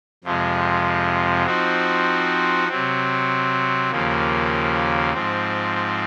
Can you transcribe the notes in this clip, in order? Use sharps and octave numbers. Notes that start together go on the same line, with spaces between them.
F2 C3 F3 G#3
F3 C4 D#4 F#4
C3 F#3 C4
D#2 C#3 F3 A#3
G#2 F3 C4